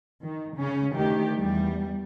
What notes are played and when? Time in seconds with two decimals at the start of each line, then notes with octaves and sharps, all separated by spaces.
0.23 D#3
0.57 C#3 C#4
0.95 D2 D#3 G4
1.37 E2 G3